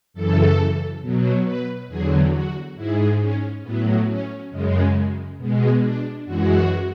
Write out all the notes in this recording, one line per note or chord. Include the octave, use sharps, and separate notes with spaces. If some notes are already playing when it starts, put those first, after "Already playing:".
F#2 C#3 E3 A4
B2 F#3
B4
E2 D3 F#3 G#4
F#4
G#2 G#3 E4
C#4
A2 F#3 B3
C#4
F#2 C#3 G#3
B2 G#3
D4
F#2 E3 G#3 F#4